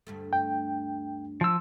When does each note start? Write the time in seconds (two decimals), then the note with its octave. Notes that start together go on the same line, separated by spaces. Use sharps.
0.07 D2 G2 A3
0.33 G5
1.41 F3 E6